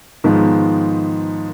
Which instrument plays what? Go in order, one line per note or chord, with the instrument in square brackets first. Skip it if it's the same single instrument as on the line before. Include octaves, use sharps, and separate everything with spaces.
[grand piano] G#2 D#3 F3 B3